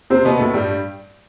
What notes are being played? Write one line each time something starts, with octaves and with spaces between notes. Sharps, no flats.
C3 C4
B2 B3
A2 A3
G2 G3